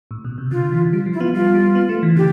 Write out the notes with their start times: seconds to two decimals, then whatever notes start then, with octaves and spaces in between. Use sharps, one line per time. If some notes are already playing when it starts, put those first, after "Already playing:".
0.11 A2
0.25 B2
0.38 C3
0.51 D3 F4
0.72 E3
0.93 G3 F4
1.06 F3
1.13 E4
1.20 B3 F4
1.34 G3 F4
1.54 G3
1.75 B3
1.89 A3
2.03 E3
2.16 D3 G4